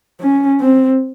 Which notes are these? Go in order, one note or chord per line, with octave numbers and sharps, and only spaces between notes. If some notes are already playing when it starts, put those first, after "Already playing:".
C#4
C4